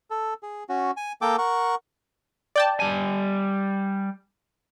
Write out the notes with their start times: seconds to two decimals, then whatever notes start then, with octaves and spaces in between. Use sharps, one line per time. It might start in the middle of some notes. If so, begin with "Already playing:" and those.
0.10 A4
0.43 G#4
0.69 C#4 F#4
0.97 G#5
1.22 A#3 A4 G5 D6
1.38 A#4 F#5 C#6
2.56 D5 G5 A5
2.80 G3 G#5